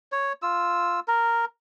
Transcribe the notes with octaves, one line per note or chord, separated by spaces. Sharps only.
C#5
F4 E6
A#4